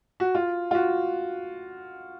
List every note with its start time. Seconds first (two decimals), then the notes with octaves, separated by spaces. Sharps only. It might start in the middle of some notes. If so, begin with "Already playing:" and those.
0.20 F#4
0.35 F4
0.71 F4
0.75 F#4